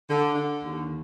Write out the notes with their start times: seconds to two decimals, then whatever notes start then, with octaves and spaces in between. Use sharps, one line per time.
0.08 D3
0.36 D3
0.64 D#2